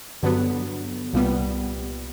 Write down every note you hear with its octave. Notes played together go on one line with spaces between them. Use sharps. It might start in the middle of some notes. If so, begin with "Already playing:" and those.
G2 D3 F#3 B3
C2 A#2 G3 B3